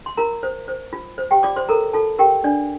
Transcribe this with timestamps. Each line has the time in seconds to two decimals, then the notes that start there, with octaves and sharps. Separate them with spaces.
0.06 C6
0.17 F4 A#4 A#5
0.43 C5
0.68 C5
0.93 F4
1.18 C5
1.31 G4 G5
1.43 F4 D5 D6
1.56 C5 C6
1.69 A4 A#4 A#5
1.93 F4 A4 A5
2.19 G4 A#4 G5
2.44 D4 D5